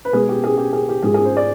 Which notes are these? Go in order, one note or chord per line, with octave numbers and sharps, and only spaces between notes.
B4
B2 G#3 B3 G#4
G4
G#4
G4
G#4
G4
G#2 F3 G#3 G#4
G#4
C5
D5